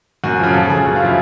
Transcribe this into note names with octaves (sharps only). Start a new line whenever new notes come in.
F#2 F#4
C#3 F3
F#2 A4
C#3 F3 G#4
F#2 F#4
F4
C#3 F3 E4